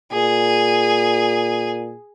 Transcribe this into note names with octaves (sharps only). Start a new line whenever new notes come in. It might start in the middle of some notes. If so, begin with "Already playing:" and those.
A#2 G#4